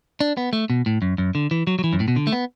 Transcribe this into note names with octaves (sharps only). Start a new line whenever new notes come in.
D4
B3
A3
B2
A2
F#2
F#2
D3
E3
F#3
F#3
E3
F#2
A2
B2
D3
A3
B3